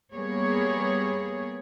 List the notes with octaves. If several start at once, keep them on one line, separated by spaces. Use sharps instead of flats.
G3 A#3 B3 G#4 C#5